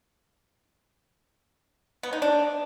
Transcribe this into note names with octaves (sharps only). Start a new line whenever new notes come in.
B3
D#4
D4